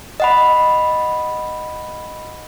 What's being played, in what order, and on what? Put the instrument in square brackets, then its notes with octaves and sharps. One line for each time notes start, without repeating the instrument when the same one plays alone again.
[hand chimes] D#5 F#5 B5